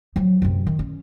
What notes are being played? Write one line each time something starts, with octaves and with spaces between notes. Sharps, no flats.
F3 F#3
F#2 C3
D#3
C#4